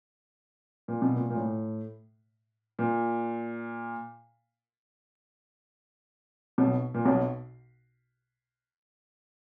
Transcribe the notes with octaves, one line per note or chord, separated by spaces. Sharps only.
A#2
B2
A#2
A#2
A2
A#2
B1 B2
A#2
B1 B2